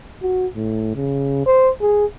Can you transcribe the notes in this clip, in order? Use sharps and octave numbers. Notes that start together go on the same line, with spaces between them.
F#4
A2
C#3
C5
G#4